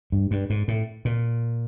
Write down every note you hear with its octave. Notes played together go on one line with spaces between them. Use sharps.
G2
G2
G#2
A2
A#2